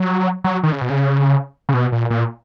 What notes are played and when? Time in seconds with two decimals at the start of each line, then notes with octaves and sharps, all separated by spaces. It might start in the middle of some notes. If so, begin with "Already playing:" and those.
Already playing: F#3
0.44 F#3
0.63 D#3
0.72 C#3
0.81 B2
0.90 C#3
1.69 C#3
1.74 B2
1.92 A#2
2.10 A#2